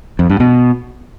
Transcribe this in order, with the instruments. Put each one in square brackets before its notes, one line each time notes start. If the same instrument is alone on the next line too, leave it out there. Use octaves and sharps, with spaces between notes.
[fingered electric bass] F2
G2
B2